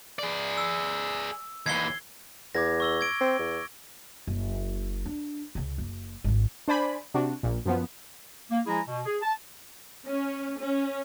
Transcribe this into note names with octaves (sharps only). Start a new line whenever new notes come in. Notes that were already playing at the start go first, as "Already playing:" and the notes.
G#4 D5
E6
D#2 E3 G#6 C7 G7
E2 D6 G#6 A#6
C#6 E6 G7
G#6 D7
C4
E2
F#1
D4
C#2 C#3
F#1
G#1 D3
D4 C5 D5 G#5 B5
C3 D4 F#4
A#1 A#2
F#2 F3 B3
A#3
F3 G#3 E4 G#4 G#5 A#5
B2
G#4
A5
C#4
C#4